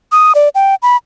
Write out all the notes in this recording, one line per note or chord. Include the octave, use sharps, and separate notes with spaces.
D#6
D5
G5
B5